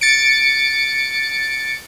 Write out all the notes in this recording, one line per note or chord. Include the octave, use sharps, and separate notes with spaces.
A6 C#7 D7